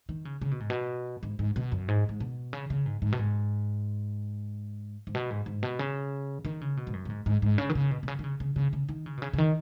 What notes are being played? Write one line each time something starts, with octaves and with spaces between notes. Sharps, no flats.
D#3
C#3
C#3
B2
G#2
B2
G#2
G#2
B2
F#2
G#2
G#2
B2
C#3
C#3
G#2
G#2
B2
G#2
G#2
B2
G#2
G#2
B2
C#3
D#3
C#3
B2
G#2
F#2
B2
G#2
G#2
G#2
C#3
D#3
C#3
B2
B2
C#3
D#3
C#3
C#3
C#3
C#3
D#3
C#3
B2
C#3
C#3
D#3